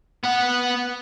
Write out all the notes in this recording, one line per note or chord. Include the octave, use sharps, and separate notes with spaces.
B3 F#5